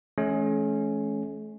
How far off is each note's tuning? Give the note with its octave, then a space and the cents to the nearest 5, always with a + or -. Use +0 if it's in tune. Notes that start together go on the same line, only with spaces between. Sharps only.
E3 +0 A3 -45 C#4 +0